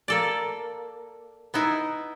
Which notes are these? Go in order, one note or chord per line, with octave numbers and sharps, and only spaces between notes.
A#3 A4 D5
B3 D#4 E4